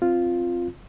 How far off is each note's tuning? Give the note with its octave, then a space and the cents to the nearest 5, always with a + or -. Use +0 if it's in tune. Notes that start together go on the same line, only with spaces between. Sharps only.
C4 +0 F4 +0